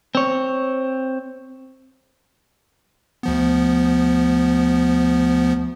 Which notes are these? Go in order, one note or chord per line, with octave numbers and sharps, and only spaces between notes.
C4 C#5
D2 F3 B3